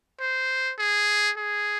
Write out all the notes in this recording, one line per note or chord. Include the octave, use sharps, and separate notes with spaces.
C5
G#4
G#4